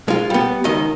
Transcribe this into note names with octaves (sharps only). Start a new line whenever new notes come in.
G#3 F4
G3 B3
C#2 D#3 D#5